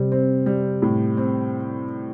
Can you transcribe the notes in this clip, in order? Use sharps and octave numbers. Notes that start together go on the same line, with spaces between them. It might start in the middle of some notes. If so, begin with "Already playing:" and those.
Already playing: C3 G3 C4
C4
G3
A2
C4